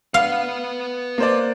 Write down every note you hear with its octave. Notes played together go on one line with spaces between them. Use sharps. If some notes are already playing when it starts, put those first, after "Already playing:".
B4 F5 F#5
A#3 C5 D5